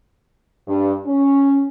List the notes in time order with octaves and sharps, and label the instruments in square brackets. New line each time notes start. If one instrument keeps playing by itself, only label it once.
[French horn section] G2
C#4